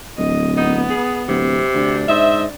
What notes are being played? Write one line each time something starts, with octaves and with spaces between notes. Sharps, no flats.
D1 D#5
B3 D#4
G#4
D1 C3
D2 D4
G#2 C5 D#5 E5